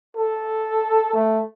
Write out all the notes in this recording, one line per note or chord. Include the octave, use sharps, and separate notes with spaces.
A4
A3